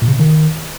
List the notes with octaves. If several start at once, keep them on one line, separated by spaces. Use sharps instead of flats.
A#2
C#3
C3
D#3